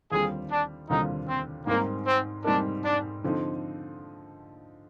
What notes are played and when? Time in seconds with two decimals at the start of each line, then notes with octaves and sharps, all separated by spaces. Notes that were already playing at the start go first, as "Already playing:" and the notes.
0.12 D#2 D3 G3 C4 F4 G#4
0.50 D4
0.89 D#2 D3 G3 C4 D#4 F4
1.28 C4
1.67 G#2 G3 A#3 C4 D#4 A#4
2.06 C4
2.44 G#2 G3 C4 D4 D#4 A#4
2.84 D4
3.24 D3 F3 C4 D#4